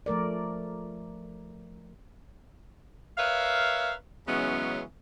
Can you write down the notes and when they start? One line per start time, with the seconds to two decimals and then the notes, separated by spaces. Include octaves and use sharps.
0.06 F3 A3 A#4 D5
3.18 A#4 B4 C#5 E5 F5
4.27 C#3 E3 F#3 G#3 B3 C#4